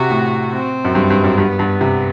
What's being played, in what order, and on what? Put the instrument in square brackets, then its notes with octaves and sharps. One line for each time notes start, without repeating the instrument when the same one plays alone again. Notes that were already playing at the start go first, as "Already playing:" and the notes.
Already playing: [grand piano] C3 [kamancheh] F#4
[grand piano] A2
[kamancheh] C4
[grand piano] F#2
G2
G2
F#2
[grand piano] G2 [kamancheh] B3
[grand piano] G2
C3